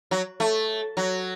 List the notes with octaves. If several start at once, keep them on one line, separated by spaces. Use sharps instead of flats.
F#3
A3
F#3